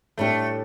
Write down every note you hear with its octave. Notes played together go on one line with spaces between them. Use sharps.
A2 G3 A3 D4 G4